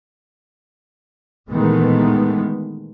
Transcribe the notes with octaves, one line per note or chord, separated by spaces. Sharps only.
A#2 D#3 E3 G#3 A3 B3